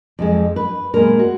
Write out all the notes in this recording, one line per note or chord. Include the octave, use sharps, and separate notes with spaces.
F2 F3 G#3
B4
A#2 G#3 B3 A#4
F#4